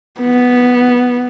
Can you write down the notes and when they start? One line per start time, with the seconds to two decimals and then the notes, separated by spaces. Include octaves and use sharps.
0.20 B3